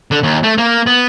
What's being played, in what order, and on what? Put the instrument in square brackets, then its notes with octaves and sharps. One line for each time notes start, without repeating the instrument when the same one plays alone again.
[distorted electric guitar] D3
D#2
A3
A#3
B3